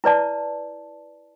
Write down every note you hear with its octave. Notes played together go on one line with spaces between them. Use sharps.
E4 B4 D5 A5